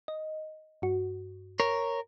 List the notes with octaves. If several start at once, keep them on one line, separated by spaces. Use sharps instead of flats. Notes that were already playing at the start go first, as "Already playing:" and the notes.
D#5
G2 F#4
A#4 C#5